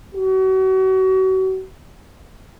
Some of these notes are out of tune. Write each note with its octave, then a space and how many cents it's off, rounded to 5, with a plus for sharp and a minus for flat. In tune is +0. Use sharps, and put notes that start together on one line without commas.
F#4 +35